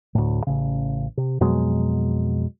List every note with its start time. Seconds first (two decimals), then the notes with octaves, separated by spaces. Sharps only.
0.15 D2 A2
0.47 A1 C#3
1.17 C3
1.40 F2 B2 F#3 G#3